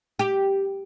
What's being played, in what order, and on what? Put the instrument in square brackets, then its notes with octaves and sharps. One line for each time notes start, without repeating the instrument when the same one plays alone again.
[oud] G4